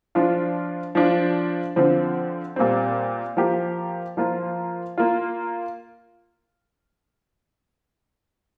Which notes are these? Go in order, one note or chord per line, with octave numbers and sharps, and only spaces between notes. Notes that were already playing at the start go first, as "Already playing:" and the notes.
F3 D4 F4
F3 D4 F4
D3 F3 C4
A#2 G3 C4
F3 A#3 G4
F3 A#3 F4
A#3 F4